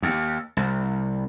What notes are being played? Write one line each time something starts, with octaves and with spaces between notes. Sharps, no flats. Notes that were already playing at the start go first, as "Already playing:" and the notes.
D#2
C2